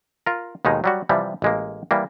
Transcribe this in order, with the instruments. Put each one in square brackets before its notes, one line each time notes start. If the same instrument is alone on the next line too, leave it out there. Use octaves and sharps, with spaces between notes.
[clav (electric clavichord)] F4 A#4
D#2 B2 D#3 G#3 D#4
F#3 G3 F#4
C3 E3 F3 G3
A1 G#3 A#3
E3 G3 A#3